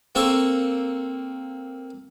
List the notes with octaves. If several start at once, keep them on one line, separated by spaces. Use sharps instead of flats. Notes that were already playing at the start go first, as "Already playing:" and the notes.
A#3 C4 A4 C#6